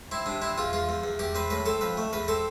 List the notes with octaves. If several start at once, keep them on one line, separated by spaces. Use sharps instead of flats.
C4 E4
C3 D4
C4 E4
E2 F4
E2 F4
E2
E2
E2 G4
C4 B4
A2 B4
C4 A4
F2 B4
A3
E2 B4
C4 A4